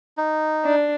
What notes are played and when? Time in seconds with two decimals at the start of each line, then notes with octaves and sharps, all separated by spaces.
0.18 D#4
0.65 D4